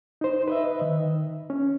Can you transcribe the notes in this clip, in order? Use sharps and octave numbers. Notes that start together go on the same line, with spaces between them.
D#4 C5
B4 D#5 E5
D#3
C#4